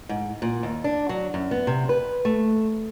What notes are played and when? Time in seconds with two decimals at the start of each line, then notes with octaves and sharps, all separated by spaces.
0.09 G#2
0.42 A#2
0.63 D#2
0.84 D4
1.09 F#3
1.34 F#2
1.51 B3
1.67 C3
1.89 B4
2.25 A3